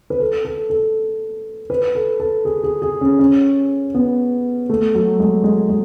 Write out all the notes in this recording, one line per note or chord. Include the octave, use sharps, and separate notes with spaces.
B4
A4
A4
A4
B4
A4
A4
G#4
G#4
G#4
C#4
C#4
B3
A3
F#3
G#3
G#3
G#3